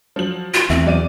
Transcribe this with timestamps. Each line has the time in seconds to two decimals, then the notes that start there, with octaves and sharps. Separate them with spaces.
0.16 F3 F#3 F#7
0.54 F4 F#4
0.70 E2 A3 C4 E4
0.86 F#3 D5 D#7